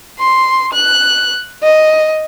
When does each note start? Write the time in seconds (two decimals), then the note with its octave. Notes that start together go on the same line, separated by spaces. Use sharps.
0.19 C6
0.73 F#6
1.63 D#5